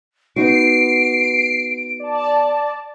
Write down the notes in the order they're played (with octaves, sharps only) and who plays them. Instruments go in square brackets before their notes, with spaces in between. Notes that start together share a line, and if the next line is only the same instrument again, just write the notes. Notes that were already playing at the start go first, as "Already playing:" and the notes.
[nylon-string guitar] B3 D#4 F#4 [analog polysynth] C7 [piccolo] D7
[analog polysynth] D5 A5